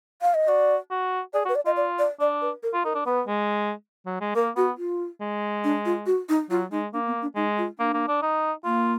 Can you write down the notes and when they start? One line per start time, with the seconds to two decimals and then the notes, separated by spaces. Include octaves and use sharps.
0.22 F5
0.34 D#5
0.48 F#4 D5
0.91 F#4
1.33 G#4 D5
1.45 F#4
1.49 B4
1.55 D5
1.66 F4 D#5
1.77 D5
1.99 D5
2.20 D4 D5
2.42 B4
2.63 A#4
2.74 F4
2.85 D#4 A#4
2.95 D4
3.06 B3 B4
3.27 G#3
4.06 F#3
4.21 G#3
4.35 A#3 A#4
4.56 B3 F#4
4.77 F4
5.21 G#3
5.64 D4
5.85 F4
6.06 F#4
6.29 D#4
6.50 F#3 F4
6.71 G#3 D#4
6.93 A#3 D4
7.07 B3
7.22 D4
7.35 G#3 D#4
7.58 F4
7.78 A#3 D4
7.94 A#3
8.08 D4
8.22 D#4
8.64 A#3 F4